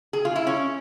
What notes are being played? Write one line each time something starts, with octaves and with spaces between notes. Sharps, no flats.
G#4
F4
E4
C#4